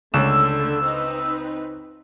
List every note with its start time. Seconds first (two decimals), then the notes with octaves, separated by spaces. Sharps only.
0.14 C#2 D3 A3 E6
0.83 C4 D#4 B4